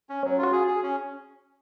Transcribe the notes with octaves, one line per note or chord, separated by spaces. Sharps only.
C#4
F#3 C#4
F4
F#4
G#4
G#4
C#4